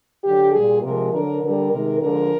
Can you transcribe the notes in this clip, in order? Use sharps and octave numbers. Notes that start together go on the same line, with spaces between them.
D3 F#3 G4
A#2 G3 G#4
C3 F3 G#3 A#4
D3 F#3 A#4
D3 G3 A#4
C3 D#3 G#3 A#4
D3 F3 G#3 A#4